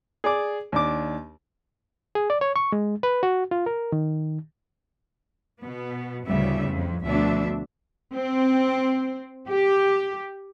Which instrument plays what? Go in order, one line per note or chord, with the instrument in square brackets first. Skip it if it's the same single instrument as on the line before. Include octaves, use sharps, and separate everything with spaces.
[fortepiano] G#4 D5 D6
D#2 D4 D6
[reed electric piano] G#4
D5
C#5
C#6
G#3
B4
F#4
F4
A#4
D#3
[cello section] B2 B3
D2 A2 C#3 G3 B3 E5
F2
D2 B2 F3 A3 D4 E5
C4
G4